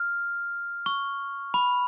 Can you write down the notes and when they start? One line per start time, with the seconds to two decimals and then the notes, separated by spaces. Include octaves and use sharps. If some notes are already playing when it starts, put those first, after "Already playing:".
Already playing: F6
0.86 C#6
1.54 B5